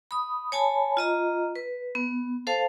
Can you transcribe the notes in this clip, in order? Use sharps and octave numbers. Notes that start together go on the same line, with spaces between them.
B5 D#6
C#5 G#5 A5 B5
F4 D#5 A#5
B4
B3
A4 C5 F5 A5